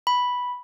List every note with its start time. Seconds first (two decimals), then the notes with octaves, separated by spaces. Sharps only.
0.07 B5